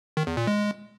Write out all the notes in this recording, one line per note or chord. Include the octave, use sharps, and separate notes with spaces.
D#3
E2
A#2
G#3